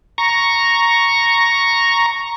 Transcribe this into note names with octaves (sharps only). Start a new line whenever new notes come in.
A#5 C#6